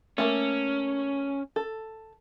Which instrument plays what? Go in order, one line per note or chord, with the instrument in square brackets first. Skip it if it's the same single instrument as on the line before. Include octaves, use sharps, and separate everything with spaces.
[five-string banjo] A3 A#3 [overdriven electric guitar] C#4
[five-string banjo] A4